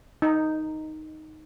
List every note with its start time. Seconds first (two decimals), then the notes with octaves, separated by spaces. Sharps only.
0.22 D#4